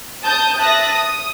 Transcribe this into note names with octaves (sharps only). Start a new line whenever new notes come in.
A5 D#6 G6
E5 A5 D#6 F#6 A#6
D#6